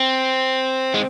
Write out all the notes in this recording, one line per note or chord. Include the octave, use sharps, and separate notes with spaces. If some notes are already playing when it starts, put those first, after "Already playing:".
Already playing: C4
G#3